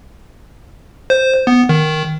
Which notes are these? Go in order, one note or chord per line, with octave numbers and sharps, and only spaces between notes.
C5
B3
D#3